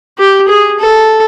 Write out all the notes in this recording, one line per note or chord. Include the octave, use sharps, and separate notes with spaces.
G4
G#4
A4